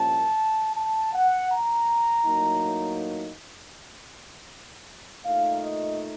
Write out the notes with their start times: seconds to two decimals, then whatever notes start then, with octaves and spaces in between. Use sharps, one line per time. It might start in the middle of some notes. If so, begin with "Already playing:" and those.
Already playing: C2 A#2 F3 A#3 C#4 A5
0.76 A5
1.13 F#5
1.50 A#5
2.25 A2 F#3 A#3 D#4
5.25 A#2 A3 D#4 F5
5.62 D#5